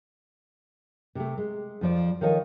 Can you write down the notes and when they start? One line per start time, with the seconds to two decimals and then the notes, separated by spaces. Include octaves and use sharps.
1.15 C3 A3
1.38 G#3
1.81 F2 F3 D5
2.21 D#3 F3 F4 A4 C#5 D#5